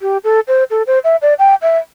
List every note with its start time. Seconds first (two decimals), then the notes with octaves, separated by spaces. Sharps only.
0.02 G4
0.24 A4
0.48 C5
0.71 A4
0.87 C5
1.04 E5
1.22 D5
1.39 G5
1.62 E5